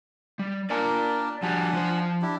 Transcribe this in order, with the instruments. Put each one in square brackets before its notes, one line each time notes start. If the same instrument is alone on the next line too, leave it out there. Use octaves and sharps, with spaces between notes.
[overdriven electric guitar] G3
[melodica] A#3 D4 A#4 [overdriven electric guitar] D5 G#5
[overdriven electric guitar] F3 G3 [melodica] D4 F#5 G#5
[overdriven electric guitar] F3 C5
[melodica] D4 E4 G4